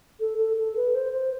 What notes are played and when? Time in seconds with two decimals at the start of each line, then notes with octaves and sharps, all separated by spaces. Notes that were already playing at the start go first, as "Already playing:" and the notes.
0.20 A4
0.38 A4
0.57 A4
0.76 B4
0.95 C5
1.13 C5